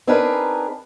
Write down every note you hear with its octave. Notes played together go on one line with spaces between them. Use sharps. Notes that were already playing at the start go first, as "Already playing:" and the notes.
C4 D4 D#4 G#4 A#4 B4